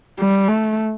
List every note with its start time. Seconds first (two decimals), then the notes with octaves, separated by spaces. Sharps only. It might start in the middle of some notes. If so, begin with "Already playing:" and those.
0.19 G3
0.48 A3